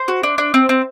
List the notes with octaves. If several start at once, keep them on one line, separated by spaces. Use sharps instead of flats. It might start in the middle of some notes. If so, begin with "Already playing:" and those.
Already playing: C5
F#4
D4
D4
C4
C4